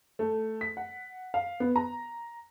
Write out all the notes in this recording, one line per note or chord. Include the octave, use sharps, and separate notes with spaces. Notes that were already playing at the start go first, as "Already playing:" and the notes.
A3
B6
F#5
F5
B3
A#5